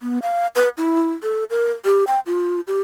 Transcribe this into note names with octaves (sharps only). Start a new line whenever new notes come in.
B3
F5
B4
E4
A4
A#4
G4
G5
F4
G4